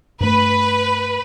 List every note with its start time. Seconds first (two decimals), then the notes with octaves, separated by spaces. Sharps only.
0.20 G2 A3 B4